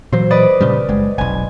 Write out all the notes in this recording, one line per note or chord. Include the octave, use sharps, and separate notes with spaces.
A#2 E3 F#3 C5
B4 D5 D#5
A#2 C#3 G3
F#1 G#3
F1 B1 G#5